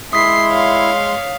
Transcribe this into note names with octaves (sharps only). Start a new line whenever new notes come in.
G#3 E4 E5 C6 D#6 B6 C7
C#5 F5